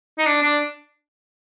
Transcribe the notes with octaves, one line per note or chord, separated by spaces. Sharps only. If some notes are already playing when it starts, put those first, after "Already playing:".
D#4
D4
D4